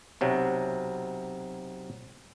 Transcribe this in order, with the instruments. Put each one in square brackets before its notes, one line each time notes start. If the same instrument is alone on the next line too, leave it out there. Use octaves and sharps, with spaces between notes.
[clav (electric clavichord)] B1 C3 F#3